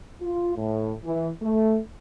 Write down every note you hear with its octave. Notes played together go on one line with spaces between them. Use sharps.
F4
A2
E3
A3